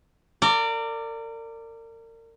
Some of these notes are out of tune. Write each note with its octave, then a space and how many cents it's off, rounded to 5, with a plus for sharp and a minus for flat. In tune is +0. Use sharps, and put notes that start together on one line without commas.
A#4 -35 D5 +0